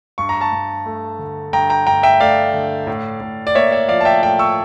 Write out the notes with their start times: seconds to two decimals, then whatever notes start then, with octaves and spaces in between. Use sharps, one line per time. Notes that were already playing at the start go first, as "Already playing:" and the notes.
0.18 G2 C#6
0.29 A#5
0.40 A5 C#6
0.52 G2
0.86 A3
1.19 D3
1.53 G2 G5 A#5
1.70 G5 A#5
1.87 G2 G5 A#5
2.03 E5 G5
2.20 A3 D5 F5
2.54 D3
2.87 A2
3.21 A2
3.47 D5
3.55 A#3 C#5 E5
3.72 C#5 E5
3.88 F3 D5 F5
4.01 A5
4.05 E5 G5
4.22 A2 E5 G5
4.39 C#6 E6